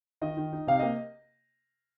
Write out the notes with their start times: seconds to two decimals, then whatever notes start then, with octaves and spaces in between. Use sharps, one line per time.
0.22 D#3 D#5
0.37 D#3
0.52 D#4
0.67 C3 F5
0.79 A#3 D#5